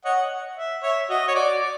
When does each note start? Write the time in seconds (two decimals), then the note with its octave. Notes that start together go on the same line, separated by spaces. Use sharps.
0.05 C#5 D#5 F#5
0.57 E5
0.83 C#5 E5
1.10 F#4 D#5
1.28 C#5
1.35 F#4 D5
1.61 D5